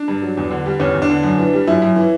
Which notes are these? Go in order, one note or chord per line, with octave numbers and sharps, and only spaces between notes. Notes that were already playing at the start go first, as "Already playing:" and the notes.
Already playing: D4
G2
F#3
E2
D3
G3
E2 C#4
E2
D4
D3
F#2
E3
G3
F#2 E4
F#2
E3